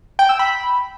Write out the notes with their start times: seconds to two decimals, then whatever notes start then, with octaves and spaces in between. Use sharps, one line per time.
0.19 G5
0.29 E6
0.39 B5